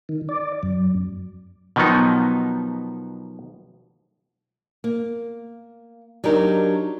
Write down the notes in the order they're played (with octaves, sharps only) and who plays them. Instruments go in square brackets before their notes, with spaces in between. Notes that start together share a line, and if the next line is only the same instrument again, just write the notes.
[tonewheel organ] D#3
D5
F#2
[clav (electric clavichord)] B2 D#3 F3 F#3 B3 D#4
[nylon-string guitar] A#3
F#3 D4 D#4 G4 A#4